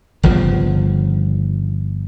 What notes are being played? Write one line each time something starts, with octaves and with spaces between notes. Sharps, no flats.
G1 C#3 F3